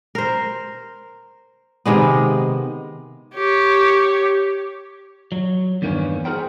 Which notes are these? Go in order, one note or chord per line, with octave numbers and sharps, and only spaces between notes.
A#4 C5
C3 D#3 G#3 B3
G4 C#5
F#3
E2 G2 D#3 A#3 B3 C#4
F#4 G#4 A#4 C5 G5